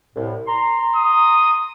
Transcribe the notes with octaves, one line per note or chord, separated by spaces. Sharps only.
C2 A2
A#5 C6
D#6